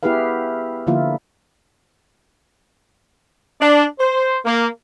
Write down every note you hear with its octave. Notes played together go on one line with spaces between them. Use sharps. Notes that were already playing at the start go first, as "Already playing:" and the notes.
B3 E4 G4 G#4 B4 F5
D3 F3 A#3 E4 F4
D4
C5
A#3